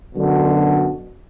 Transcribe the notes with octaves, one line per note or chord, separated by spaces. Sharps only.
F#2 B2 D3